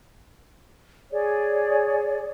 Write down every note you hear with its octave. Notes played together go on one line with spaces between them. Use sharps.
G#4 C#5 D5